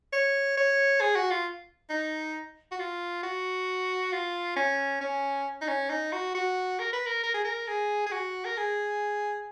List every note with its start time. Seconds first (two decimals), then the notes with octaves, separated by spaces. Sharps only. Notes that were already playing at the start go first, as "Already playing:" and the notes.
0.13 C#5
0.57 C#5
1.01 G#4
1.16 F#4
1.31 F4
1.90 D#4
2.72 F#4
2.79 F4
3.23 F#4
4.13 F4
4.56 C#4
5.01 C#4
5.61 D#4
5.68 C#4
5.90 D#4
6.13 F#4
6.35 F#4
6.79 A#4
6.93 B4
7.07 A#4
7.23 A#4
7.34 G#4
7.45 A#4
7.68 G#4
8.07 G#4
8.12 F#4
8.45 A#4
8.57 G#4